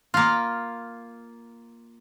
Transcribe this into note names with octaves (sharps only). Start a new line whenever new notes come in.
A#3 F4